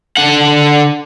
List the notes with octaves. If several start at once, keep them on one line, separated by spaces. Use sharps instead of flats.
D3 F#5